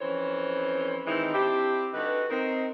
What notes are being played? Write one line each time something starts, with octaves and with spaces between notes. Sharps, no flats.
F2 E3 C4 C#4 C5 C#5
D#3 E3 G#3 C4 D#4 E4
C4 D4 E4 G4
D3 G3 D#4 F#4 B4
C4 D#4 A#4